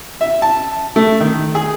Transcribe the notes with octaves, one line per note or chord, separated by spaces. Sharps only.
E5
A5
A3
D#3
G#4